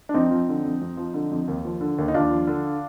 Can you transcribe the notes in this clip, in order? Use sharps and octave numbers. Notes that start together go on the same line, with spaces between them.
D4
F2 C4 D#4
F3
D3
F2
F2
F3
D3
F2
D#2
F3
D3
D#2
D#4
D#2 D4 F4
F3
D3